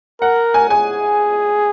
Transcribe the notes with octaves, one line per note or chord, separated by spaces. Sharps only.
A#4 F#5
G#5
G#4 G#5